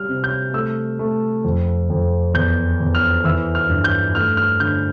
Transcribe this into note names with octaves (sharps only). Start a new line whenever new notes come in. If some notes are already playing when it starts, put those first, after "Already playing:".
Already playing: G3 F6
C3
G6
A3 E6
A3
F2
F2
E2 G6
E2
F6
E3 E6
F6
G2
G6
A3 F6
F6
D3 G6